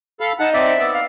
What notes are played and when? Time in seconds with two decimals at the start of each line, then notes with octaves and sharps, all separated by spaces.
0.21 A4 F5 B5
0.39 D#4 F#5 A5
0.54 C4 D5 E5
0.79 B3 D5 E6
0.93 F5